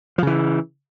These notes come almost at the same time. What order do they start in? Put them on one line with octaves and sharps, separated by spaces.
F3 C#3 E3